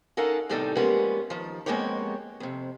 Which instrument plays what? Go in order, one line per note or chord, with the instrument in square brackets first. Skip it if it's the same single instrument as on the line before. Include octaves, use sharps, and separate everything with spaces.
[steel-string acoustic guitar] C#4 D#4 A4 A#4 F5 F#5
E2 A2 C3 G3 D#4 A4
F3 G3 G#3 A#3 B3 C#4
D#3 F3
F2 G#3 A#3 B3 G4 C#5
F2 C3